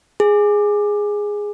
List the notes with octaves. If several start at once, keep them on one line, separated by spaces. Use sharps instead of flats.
G#4